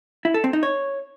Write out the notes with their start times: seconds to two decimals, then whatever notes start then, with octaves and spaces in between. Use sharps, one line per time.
0.25 E4
0.34 A4
0.44 C4
0.53 D#4
0.63 C#5